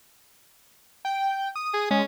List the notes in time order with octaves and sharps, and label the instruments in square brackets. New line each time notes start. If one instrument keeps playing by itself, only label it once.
[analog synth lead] G5
D#6
[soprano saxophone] G#4
[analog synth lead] G#3 [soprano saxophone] C#4